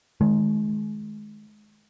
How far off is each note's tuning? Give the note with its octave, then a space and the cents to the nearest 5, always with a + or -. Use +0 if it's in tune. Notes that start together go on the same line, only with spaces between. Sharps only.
D#3 +0 G#3 +25